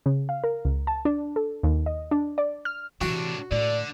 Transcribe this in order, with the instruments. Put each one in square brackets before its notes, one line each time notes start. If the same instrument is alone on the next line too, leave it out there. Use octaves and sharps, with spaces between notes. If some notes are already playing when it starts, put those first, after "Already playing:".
[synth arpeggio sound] C#3
F5
A#4
C#2
A5
D4
A4
D#2
D#5
D4
D5
F6
[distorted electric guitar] A2 D4 [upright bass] C3 E3 [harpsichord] F#4
[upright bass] A2 [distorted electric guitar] D3 [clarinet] D5